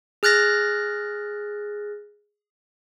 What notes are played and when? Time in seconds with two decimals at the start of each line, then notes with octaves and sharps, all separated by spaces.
0.23 G#4 F6 F#6 A6 A#6